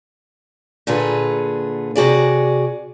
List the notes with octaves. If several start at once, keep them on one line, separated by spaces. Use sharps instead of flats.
A#2 D3 G#4 B4
C3 F#4 G#4 D5